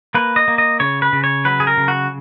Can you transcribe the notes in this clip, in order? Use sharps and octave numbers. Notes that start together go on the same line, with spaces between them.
A#3 B4
D#5
A#3
D#5
C#3 C#5
B4
C#3
C#5
F#3 B4
G#4
A#4
C#3
F#4